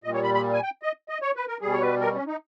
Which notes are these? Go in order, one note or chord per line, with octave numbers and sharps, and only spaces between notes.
A#2 G3 D#5
C#5
B5
B5
G#5
G5
D#5
D#5
C#5
B4
A#4
B2 G3 G#4
C#5
B4
A#4
C#4
D#4